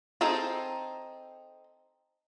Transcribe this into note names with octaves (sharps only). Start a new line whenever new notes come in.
C4 D#4 G#4 A4 C5